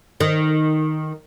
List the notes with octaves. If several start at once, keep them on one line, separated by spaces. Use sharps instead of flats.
D#3